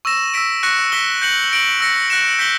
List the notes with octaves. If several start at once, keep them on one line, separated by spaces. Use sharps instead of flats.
C#6 E6 A#6 E7
E6 B6 D7
C#6 F#6 A#6 C#7
E6 B6 E7 G7
G6 A#6 C#7 F#7
A#6 D7 F#7
E6 A#6 C#7
F#6 A#6 C#7 E7
G6 B6 D7 G7